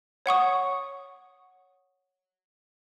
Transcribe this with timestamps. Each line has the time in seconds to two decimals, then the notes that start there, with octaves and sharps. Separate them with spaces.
0.26 C#5 F#5 C#6 D#6